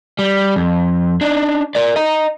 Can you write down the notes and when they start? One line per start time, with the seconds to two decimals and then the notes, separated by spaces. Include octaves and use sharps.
0.19 G3
0.56 F2
1.21 D4 D#4
1.75 A#4 D5
1.96 D#5 A#5